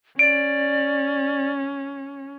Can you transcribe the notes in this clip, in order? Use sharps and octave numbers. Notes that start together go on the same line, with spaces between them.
C#4 D5 D7